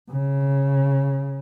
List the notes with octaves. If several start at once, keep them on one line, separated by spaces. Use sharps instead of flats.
C#3